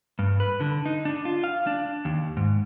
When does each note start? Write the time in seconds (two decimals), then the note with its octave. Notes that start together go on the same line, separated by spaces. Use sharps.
0.19 G2
0.40 B4
0.60 D3
0.86 D#4
1.05 D4
1.25 F4
1.44 F5
1.67 D4
2.05 D#2
2.37 G#2